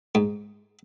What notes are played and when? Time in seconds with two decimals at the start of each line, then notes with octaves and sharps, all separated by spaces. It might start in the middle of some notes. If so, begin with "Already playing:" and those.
0.15 G#2